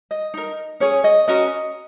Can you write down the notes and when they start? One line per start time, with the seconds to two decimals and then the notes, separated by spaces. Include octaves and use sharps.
0.11 D#5
0.34 D#4 A#4
0.80 C#4 G#4 C#5
1.04 D#5
1.28 C#4 F#4 A#4 D#5